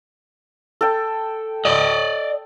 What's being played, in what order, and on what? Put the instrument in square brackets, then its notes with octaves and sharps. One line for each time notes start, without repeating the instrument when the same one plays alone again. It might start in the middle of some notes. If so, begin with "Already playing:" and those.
[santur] A4 G5
[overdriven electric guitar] D5 D#5